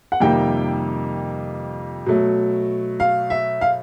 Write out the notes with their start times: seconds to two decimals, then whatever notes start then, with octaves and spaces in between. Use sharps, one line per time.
0.12 F#5
0.20 F2 C3 D#3 G3 A#3 G5
2.06 B2 F#3 A3
3.00 F5
3.30 E5
3.61 F5